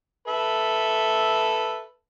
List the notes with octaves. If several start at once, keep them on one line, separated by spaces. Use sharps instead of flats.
A4 B4 E5